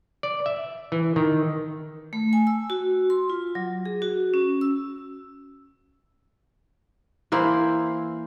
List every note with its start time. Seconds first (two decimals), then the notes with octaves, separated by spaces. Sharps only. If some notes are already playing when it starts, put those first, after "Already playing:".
0.23 D5
0.46 E5
0.92 E3
1.16 D#3
2.13 A3
2.33 G#5
2.47 E6
2.70 F#4
3.10 C6
3.30 F4
3.55 F#3
3.85 G#4
4.02 F#4
4.34 C#4
4.61 E6
7.32 E3 A#3 E4 C5